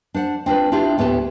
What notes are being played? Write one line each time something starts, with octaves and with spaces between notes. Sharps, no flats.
D4 C5 F#5
C4 D4 F4 B4
D4 E4 F4 G4 E5
D2 A2 B3 G4 A5